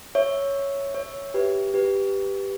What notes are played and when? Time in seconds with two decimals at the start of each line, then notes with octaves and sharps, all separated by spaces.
0.15 C#5 E5
0.94 C#5 E5
1.34 G4 B4
1.74 G4 B4